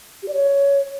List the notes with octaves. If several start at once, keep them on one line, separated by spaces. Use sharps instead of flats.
G4
D5
C#5